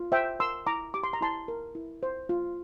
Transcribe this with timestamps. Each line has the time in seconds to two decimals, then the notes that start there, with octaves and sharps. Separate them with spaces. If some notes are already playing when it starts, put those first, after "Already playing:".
Already playing: F4
0.12 C5 E5 G5
0.39 A#4 C6 E6
0.67 E4 A#5 D6
0.94 G4 D6
1.04 C6
1.13 A#5
1.21 E4 A5 C6
1.48 A#4
1.75 E4
2.03 C5
2.29 F4